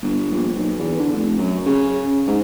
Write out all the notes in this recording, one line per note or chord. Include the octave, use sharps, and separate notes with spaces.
G1
A#1
B1
E2
D3
F1
F#2
C#3
G#2